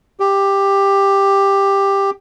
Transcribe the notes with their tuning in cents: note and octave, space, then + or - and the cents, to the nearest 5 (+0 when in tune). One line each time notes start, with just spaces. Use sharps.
G4 +10